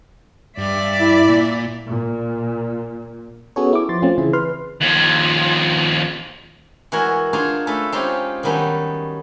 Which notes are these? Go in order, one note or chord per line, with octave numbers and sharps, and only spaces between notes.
G2 D5 E5
E4
A#2
A#2
B3 C#4 F#4 G#4 A4 C#5
E4 D6
F3 C6 A6
A3 C4 C#4 F4
C#3 E3 E4 G#4
B4 C6 F6
D#2 F3
E3 G#3 F#4 A#4 C#5
D4 D#4 F4 G#4 C#5
A3 C#4 D#4 A4 B4
G#3 C4 C#4 D#4 F4 G4
D#3 F#3 G3 B3 C#4 D#4